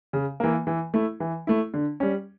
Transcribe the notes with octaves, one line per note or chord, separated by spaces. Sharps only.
C#3
E3 A#3
E3
A3 E4
E3
A3 E4
D3
G3 C#4